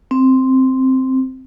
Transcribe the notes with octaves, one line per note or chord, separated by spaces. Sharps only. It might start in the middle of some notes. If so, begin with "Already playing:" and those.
C4